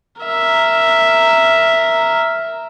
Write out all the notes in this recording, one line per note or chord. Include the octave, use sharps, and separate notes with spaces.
A#4 E5